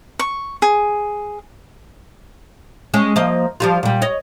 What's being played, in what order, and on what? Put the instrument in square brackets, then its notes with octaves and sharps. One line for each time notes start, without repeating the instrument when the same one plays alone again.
[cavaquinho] C#6
G#4
[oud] G#3 C#4
F3 A#3 D#5
F3 G3 F4
A#2 G3
C#5 D#5